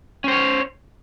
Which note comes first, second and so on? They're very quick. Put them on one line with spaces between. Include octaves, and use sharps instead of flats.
C#4 C5 C#5